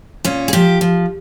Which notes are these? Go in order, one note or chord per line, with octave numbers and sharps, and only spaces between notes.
A#2 C#4
G#4
F3 G4
F3